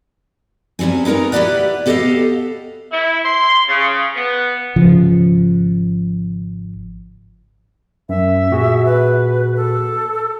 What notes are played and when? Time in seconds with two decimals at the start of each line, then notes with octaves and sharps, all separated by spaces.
0.79 E2 C#3 G3 C4 G#5
1.05 B3 D#4 F4 A#4 A#5
1.32 E4 G4 G#4 B4 D5 F#5
1.86 B3 G4 A4 C#5 D#5 F5
2.92 E4
3.25 C6
3.69 C#3
4.16 B3
4.76 G#1 C#3 F3
8.09 F#2 E5
8.51 A#2 F#4 G#4
8.85 B4
9.56 A4